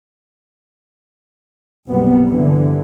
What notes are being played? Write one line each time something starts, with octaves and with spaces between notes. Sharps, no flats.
F#1 B1 C3 G3 B3
G2 D3 E3